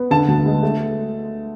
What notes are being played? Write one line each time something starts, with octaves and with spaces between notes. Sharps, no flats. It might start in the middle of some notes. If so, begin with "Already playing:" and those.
Already playing: B3
D3 A5
D2
G#3
A3